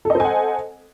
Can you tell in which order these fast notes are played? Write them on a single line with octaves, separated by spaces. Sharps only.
A4 D#5 C5 G#5 F#5